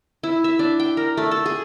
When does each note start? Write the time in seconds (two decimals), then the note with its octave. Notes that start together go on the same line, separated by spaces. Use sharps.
0.23 E4
0.44 E5
0.59 D4
0.80 G5
0.97 A#4
1.17 A3
1.31 A4
1.46 G#4